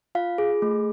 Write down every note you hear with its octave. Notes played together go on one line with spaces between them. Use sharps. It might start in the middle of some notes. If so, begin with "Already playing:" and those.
F4 F5
G#4
A3